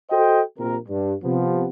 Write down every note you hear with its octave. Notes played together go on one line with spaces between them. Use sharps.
F#4 A4 C5 D#5 G5
A#1 C3 A#4
G2
C3 F3 B3